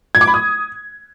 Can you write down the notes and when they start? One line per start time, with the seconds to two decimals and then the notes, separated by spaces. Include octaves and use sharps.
0.15 G#6
0.21 D6
0.27 B5
0.34 D#6